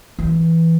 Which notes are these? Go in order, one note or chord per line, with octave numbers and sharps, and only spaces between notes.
E3